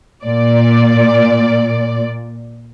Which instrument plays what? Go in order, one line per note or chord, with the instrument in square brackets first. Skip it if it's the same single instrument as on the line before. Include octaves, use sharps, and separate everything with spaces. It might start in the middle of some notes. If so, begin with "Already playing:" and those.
[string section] A#2 D5